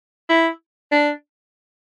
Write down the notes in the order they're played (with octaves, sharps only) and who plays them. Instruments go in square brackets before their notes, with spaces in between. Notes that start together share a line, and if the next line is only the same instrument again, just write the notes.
[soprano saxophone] E4
D4